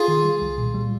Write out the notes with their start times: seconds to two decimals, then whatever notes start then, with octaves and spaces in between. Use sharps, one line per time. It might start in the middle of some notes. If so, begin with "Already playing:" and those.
Already playing: F4 G#4
0.08 D#3
0.24 G3
0.41 C2
0.58 A#2
0.74 G3